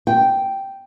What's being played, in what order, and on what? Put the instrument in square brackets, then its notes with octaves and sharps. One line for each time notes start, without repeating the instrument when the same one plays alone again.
[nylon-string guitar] G5